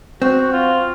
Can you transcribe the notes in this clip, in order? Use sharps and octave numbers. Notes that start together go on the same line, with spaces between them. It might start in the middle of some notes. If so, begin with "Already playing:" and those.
C4 F#4
F4